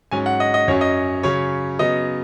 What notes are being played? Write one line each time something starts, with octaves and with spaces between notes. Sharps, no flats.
G#2 F#3 C#4 G#5
F#5
D#5
D#5
F#2 F#3 C#4 C#5
D#5
C#3 F#3 C#4 C#5
C#3 F#3 B3 D#5